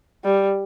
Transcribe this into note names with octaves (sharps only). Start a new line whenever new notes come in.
G3